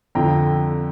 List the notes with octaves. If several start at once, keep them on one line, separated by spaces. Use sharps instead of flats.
F2 D3 F3 G5 A#5